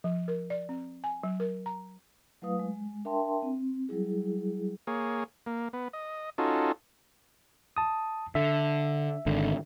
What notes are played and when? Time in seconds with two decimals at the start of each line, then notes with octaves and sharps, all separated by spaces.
0.04 F3
0.28 A#4
0.50 D5
0.69 C4
1.04 G#5
1.24 F#3
1.40 A#4
1.66 A#5
2.42 F#3 A3 E4 B4 F5 D#6
2.59 G#3
3.05 D4 A#4 E5 G5 A5 C6
3.42 C4
3.89 F#3 G3 E4 G#4
4.87 A#3 G#4 C#5
5.46 A#3
5.73 B3
5.93 D#5
6.38 C#4 D#4 F4 F#4 A4
7.77 A5 D#6
8.35 D3 E5
9.26 G#1 D3